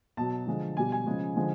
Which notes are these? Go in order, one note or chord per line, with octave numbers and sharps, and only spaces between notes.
B2 F#3 A5
D3 F3 G#3
B2 G3 G#5
G#5
C#3 F3 G#3
D3 F3 G#3